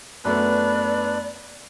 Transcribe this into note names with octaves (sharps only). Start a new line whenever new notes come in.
F#2 A3 B3 D4 B4 D5